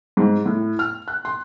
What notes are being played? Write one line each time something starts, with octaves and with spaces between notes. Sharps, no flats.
G#2
A2
F6
F#6
C6